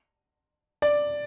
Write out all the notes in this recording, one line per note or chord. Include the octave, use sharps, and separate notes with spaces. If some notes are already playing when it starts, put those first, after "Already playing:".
D5